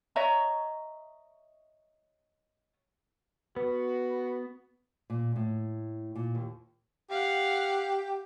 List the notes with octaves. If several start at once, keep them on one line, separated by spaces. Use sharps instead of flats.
C#5 D#5 E5 A#5
B3 F#4 B4
A#2
A2
A#2
D#2
G4 F5 F#5